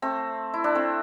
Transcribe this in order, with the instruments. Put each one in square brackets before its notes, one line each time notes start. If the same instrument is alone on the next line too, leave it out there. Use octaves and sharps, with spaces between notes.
[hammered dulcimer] A3 C4
E4
D4
A3 C4